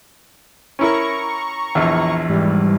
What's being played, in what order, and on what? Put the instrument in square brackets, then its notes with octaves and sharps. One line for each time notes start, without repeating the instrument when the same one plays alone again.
[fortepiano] C#4 E4 A#4 [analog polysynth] A#5 C#6
[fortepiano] A#1 E2
[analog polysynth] G#2 E3 G3